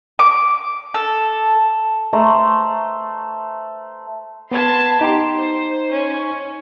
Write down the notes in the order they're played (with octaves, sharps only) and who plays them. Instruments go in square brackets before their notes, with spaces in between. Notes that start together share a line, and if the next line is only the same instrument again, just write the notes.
[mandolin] D6
A4
[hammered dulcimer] A3 C5 A#5
[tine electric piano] B3 G#6 [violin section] A5 B5 C6
[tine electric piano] D#4 C6 [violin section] G4
[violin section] C5
C#4